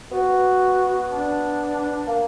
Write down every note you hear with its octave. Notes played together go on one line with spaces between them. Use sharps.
B3 F#4
D4
A#3